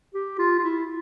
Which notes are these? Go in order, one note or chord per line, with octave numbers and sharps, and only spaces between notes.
G4
F4
F4
E4